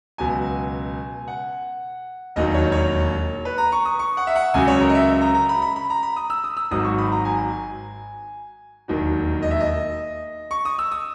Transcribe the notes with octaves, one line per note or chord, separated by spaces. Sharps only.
C#2 B2 F#3 G#5
F#5
E1 D#2 D#3 F#3 D#5
C#5
C#5
B4
A#5
C#6
D#6
C#6
F#5
E5
F#5
C#2 C#3 F#3 G#5
C#5
A#4
D#5
E5
A#5
A#5
B5
B5
B5
A#5
B5
D#6
E6
D#6
E6
G#1 G#2 F#3 D#6
C#6
B5
A#5
G#5
E1 D#2 D#3 F#3
D#5
E5
D#5
C#6
D#6
E6
D#6